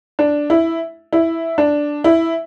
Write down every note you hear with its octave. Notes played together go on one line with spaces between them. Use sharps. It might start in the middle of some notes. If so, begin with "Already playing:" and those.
D4
E4
E4
D4
E4